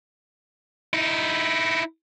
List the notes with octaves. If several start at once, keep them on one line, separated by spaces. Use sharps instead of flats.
D#4 E4